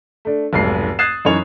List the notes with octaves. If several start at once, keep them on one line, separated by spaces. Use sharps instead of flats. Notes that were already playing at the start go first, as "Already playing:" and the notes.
A3 D4
F1 B1 G#2 C7
D#6 F#6 G#6 A6 C7 E7
F#2 E3 C#4 D#4 C#5 F7